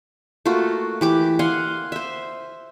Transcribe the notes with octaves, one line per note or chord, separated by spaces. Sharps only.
A3 A#3 F4 F#4
E3 G4 D6
F5 F#5 G#5 C6
C5 E5